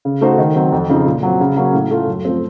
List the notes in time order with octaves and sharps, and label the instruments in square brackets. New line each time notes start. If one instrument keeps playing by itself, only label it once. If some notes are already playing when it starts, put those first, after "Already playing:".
[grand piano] C#3
A3 D#4 F#4 C5
D#3
F#3 C4
F2
C#3 F3 C4 D#4
A#2
F#3 C4
C#3
F#3 A#3 C#4
A2
A3 C#4 F4
F#2
F3 A3 C4